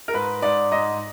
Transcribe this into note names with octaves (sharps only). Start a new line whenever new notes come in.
A#4
G#2 B4
G#2 D5
G#2 D#5